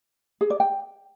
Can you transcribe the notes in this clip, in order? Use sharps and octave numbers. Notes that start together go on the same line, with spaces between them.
G#4
D5
G5